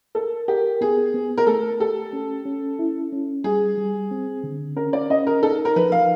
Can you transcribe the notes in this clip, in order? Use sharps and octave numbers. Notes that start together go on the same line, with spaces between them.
A4 A#4
G4 A#4
B3 G#4
B3
A#4
A3 A4
G4 A4
C#4
C#4
E4
C#4
G3 G#4
G3
C4
D3
C#4 A#4
D5
C#4 D#5
A#4
D#4 A4
A#4
F3 B4
F5